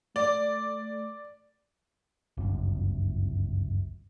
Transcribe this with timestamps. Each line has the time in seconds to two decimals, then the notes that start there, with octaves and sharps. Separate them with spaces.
0.16 A3 D5
2.37 G1 C#2 F#2